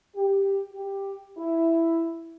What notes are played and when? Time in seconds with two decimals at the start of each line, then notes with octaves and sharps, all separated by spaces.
0.16 G4
0.73 G4
1.38 E4